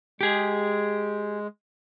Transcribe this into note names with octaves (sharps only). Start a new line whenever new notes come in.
G#3 G4 G#4